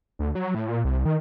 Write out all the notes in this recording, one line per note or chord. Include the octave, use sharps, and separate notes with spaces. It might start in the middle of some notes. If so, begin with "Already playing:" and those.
D2
F#3
A2
A#2
C2
D#3